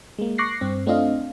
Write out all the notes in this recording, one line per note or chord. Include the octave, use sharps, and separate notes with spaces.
G#3 A#3
C#6 D6 F#6 A#6 C7
G2 C4
A3 C4 D4 F4 D#5 F5